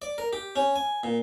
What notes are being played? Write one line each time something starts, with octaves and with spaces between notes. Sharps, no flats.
D5
A#4
G4
C#4
G#5
A#2